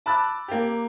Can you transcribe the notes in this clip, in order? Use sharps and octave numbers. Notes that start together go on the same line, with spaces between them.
A5 B5 D6 E6 F#6 A6
A#3 G4